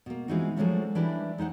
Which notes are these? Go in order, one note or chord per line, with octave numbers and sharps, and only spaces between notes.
B2 A#3
E3 G#3 C4 D#4 F4 F#4
F3 F#3 G#3 A3 C#4 D4
E3 G3 D4 E4 G4 B4
G#3 D#4 C5 F#5